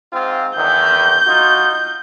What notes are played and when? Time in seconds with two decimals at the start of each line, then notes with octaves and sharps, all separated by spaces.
0.13 G#2 C4 F4
0.57 E2 D#3 G6
1.26 D#4 F4 F#4